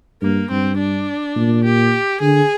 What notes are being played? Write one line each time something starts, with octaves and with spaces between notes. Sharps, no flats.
G2 A#3
G2 C4
D4
A#2
G4
D3 G#4